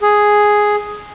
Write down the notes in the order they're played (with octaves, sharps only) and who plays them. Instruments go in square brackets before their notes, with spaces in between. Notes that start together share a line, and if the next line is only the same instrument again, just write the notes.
[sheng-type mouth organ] G#4